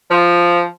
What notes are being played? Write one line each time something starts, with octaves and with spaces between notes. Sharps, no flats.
F3